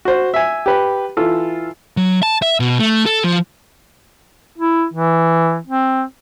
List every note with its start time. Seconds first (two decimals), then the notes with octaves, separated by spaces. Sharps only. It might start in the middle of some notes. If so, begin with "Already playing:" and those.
0.05 F#4 C5
0.34 E5 G#5
0.66 G4 B4
1.17 E3 F4 A4
1.97 F#3
2.23 A5
2.42 E5
2.60 B2
2.79 A3
3.06 A4
3.24 F3
4.58 E4
4.94 E3
5.67 C4